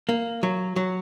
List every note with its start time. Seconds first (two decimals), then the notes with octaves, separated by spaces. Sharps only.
0.09 A#3
0.43 F#3
0.76 F#3